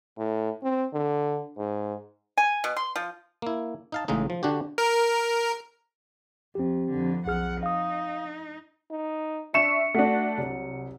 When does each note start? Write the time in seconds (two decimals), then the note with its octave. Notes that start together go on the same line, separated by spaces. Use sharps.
0.18 A2
0.63 C4
0.93 D3
1.58 G#2
2.37 G#5
2.64 B2
2.76 C6
2.96 F3
3.42 A#3 E4
3.92 D#4 F5 A5
4.08 A1 A2 C#3 G#3 D#4
4.30 F3
4.43 D3 D4 F#4 G4
4.78 A#4
6.55 F2 C4 G4
6.90 F2 D3
7.26 B1 F2 G#4 F#5 F6
7.63 D#4 F5 D#6
8.90 D#4
9.54 D4 E5 C#6 C#7 E7
9.94 A3 D4 F#4
10.38 C2 F#3